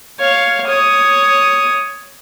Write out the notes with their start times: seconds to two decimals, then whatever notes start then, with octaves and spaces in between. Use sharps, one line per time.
0.20 C#5 F5
0.68 C#5 D#6